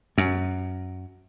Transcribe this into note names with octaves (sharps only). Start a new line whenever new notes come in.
F#2